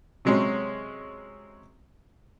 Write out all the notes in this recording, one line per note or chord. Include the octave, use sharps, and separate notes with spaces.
C3 F#3 G#3 C4 C#4